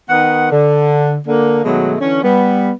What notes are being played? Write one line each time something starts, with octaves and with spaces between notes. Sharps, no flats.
D#3 B3 A#4 F#5
D3
D3 A#3
B2 D#3 F#3 G#3 A3
D3 E3 C#4
G3 B3